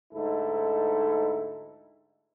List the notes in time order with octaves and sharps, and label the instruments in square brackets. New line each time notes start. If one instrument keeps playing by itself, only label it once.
[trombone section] D2 G#2 D#4 E4 A4